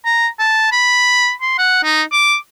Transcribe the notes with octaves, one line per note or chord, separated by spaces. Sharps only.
A#5
A5
B5
C6
F#5
D#4
D6